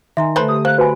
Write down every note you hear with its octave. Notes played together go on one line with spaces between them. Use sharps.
D#3 E5 G#5 A#5 C6
D3 F3 A3 A4 B4 C5
G4 D#6
A#3 C5 F#6
F#4 B4 C5 G#5